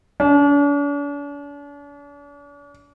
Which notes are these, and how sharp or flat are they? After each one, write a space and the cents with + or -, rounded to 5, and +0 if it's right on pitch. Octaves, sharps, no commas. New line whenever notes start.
D4 -45